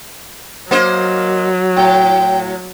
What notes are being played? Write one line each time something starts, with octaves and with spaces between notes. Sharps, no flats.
F#3 A#3 C5 D#5
A2 G5